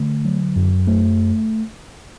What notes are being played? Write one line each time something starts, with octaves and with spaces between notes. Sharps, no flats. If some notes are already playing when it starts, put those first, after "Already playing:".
Already playing: D3 A3
F#3
F#2
A3